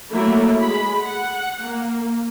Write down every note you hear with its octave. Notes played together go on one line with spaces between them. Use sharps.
F#3 A3 A#3 E4
G#3 B5
F#5
A#3